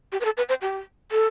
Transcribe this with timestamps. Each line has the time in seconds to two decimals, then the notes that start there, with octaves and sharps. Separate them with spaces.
0.12 G4
0.21 B4
0.25 A4
0.37 B4
0.49 C5
0.62 G4
1.11 A4